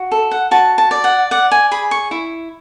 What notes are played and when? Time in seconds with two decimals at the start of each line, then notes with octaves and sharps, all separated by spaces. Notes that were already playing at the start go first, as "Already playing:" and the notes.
Already playing: F#4
0.12 A4
0.31 F#5
0.51 F#4 A5
0.78 A5
0.91 D5
1.04 F#5
1.31 D5 F#5
1.51 G#5
1.71 G#4 B5
1.91 C#6
2.11 E4